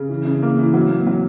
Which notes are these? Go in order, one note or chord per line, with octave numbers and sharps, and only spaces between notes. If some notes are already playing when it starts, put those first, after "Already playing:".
Already playing: C#3
E3
C#3
A#3
E3
F#3
A#3
F#3